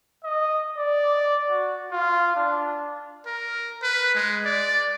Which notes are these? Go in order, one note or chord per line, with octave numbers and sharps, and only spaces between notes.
D#5
D5
F#4
F4
D4
A#4
B4
G#3
D5